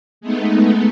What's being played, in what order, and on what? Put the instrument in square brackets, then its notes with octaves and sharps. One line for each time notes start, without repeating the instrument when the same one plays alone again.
[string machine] G#3 A3 B3 D#4